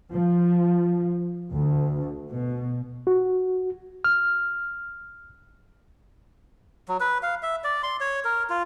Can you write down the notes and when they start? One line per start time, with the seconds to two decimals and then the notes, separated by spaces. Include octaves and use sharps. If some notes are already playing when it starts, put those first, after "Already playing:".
0.13 F3
1.52 D2
2.30 B2
3.07 F#4
4.04 F6
6.88 F#3
7.00 B4
7.23 F5
7.43 E5
7.64 D5
7.83 C6
8.00 C#5
8.24 A#4
8.50 F4